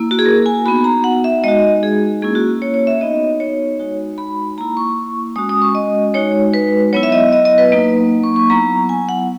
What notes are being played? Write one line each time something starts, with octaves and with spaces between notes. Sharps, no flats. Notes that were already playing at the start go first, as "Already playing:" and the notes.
Already playing: A#3 E4
F#4
G#4
A#4
G#5
B3 D#4 F#4 B5
A#5
F#5
E5
G#3 D#4 F#4 D#5
G#4
A#3 C#4 E4 G#4
F#4
C#5
C#5
E5
B3 D#4 F#4 D#5
C#5
G#3 D#4 F#4
B5
A#3 E4 A#5
C#6
G#3 C#4 F#4 D#6
D#6
C#6
D#5
G#3 D#4 F#4 C#5
B4
F#3 B3 E4 C#5
E5
D#5
D#5
D#5
B4
F#3 A#3 D#4
C#6
C#6
F#3 B3 E4 A#5
G#5
F#5